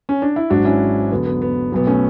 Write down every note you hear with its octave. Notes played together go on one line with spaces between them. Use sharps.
C#4
D4
E4
G#1 G#2 F#3 D4 F#4
C#4 E4
E2 D3 F#3 B3
B3
B3
B1 B2 F#3 B3
A3 C#4